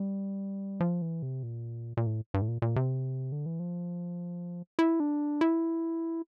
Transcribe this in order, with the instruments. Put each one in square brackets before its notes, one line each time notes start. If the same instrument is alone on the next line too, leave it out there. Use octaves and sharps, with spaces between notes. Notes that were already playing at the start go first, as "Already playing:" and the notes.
Already playing: [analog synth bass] G3
F3
E3
C3
A#2
A#2
A2
G2
A2
A#2
A#2
C3
D3
E3
F3
E4
D4
E4